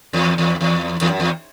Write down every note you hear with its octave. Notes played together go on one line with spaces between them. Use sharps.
E2
E2
E2
E2
F#2
E2